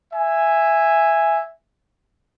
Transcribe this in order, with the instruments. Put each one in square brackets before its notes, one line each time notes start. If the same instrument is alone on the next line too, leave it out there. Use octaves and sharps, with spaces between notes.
[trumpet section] E5 G#5